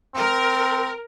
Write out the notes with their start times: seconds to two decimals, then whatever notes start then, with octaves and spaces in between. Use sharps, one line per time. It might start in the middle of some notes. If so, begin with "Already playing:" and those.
0.15 C4 A#4